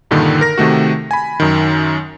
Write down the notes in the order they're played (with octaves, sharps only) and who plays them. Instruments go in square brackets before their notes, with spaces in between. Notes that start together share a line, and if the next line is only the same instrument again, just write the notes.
[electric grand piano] G2 A#2 D3 D#3
A#4 A#6
C3 D#3 A3 F#4
G#5 B5
F#2 D#3